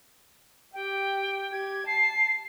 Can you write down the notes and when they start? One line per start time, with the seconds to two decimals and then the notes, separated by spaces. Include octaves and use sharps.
0.74 G4 G5
1.52 G4 G#6
1.87 A5 C7